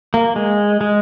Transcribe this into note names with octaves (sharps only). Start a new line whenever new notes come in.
A#3
G#3
G#3